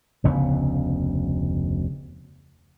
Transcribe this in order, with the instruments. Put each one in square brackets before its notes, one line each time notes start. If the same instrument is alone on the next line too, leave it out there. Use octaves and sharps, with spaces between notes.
[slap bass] F1 D2 C#3 B3